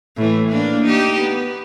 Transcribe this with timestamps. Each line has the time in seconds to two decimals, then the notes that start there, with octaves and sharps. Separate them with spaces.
0.16 A2 E3
0.49 A#3 D4
0.85 D#4 G4
1.20 B3